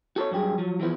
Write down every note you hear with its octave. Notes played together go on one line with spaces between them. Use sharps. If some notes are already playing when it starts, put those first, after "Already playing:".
F#4 A4 B4 C#5
G2 F#3 G4 G#4
F3 F#3
E3 F3 B3